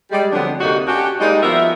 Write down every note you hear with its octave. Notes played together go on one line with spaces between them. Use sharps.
G3 G#3
D3 F3 F#3 B3 C4 D4
D2 C3 A#3 D#4 F#4
C#4 D4 F#4 G4
G3 G#3 A#3 D#4
F3 B3 F#4 A#4 E5